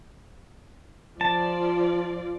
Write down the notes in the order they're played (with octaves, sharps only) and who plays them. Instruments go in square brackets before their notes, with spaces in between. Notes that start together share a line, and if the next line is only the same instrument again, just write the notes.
[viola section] F3 F4 D5 [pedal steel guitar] A5